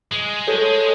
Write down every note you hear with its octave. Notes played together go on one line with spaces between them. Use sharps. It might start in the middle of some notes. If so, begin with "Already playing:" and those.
G#3
A4 C#5